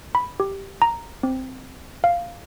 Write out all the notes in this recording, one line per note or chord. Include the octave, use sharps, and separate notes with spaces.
B5
G4
A#5
C4
F5